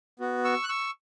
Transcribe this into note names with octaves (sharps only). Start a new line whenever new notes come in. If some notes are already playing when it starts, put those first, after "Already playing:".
B3 F#4
C#6 E6
F#6
C#6 E6